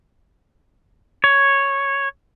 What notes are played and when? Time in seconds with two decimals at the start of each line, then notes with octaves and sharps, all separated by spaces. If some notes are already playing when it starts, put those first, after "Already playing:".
1.24 C#5